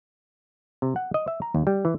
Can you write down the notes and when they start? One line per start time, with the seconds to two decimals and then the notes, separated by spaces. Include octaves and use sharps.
0.82 C3
0.96 F#5
1.14 D#5
1.28 E5
1.42 A#5
1.55 D#2
1.67 G3
1.85 E3